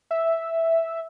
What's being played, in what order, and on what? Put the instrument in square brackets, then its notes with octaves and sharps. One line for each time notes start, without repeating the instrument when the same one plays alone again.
[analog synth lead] E5